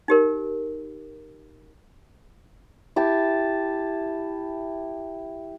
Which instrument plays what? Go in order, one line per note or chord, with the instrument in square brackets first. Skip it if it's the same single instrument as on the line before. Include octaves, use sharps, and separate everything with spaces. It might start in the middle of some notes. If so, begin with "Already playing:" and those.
[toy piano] D#4 G4 A#4
[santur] E4 G4 A5